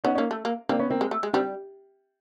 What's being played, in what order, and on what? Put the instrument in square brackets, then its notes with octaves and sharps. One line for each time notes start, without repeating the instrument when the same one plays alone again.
[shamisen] B3 [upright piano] C#4 D#4
[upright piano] C#4 D#4
[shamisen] A#3
A3
A#3
[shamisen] A#3 [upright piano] C4 D4
[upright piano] B3 C#4
A#3 C4
[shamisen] G#3
A3
G#3
[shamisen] G3 [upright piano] C4 D4